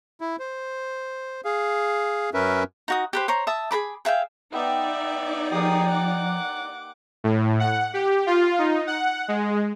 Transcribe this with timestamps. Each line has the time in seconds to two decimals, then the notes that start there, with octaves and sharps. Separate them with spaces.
0.21 E4
0.39 C5
1.45 G#4 F5
2.34 F#2 C#4 A#4 B4 E5
2.88 D#4 F#4 D#6
3.13 G4 B4 C5
3.28 C5 C#5 A#5
3.47 E5 A5 D#6
3.71 G#4 A#4 B5 D6
4.05 G#4 E5 F5 G5
4.53 B3 D#4 D5 E5 G5
5.51 F3 A#3 G4 G#4 D#6
5.89 F#5 D6
7.24 A2
7.60 F#5
7.94 G4
8.27 F4
8.59 D#4
8.87 F#5
9.28 G#3